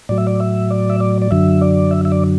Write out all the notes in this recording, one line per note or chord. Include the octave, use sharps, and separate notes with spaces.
A2 F#3 D5
E5
D5
E5
D5
E5
D5
D5
F#2 D3 F#3 E5
D5
E5
E5
D5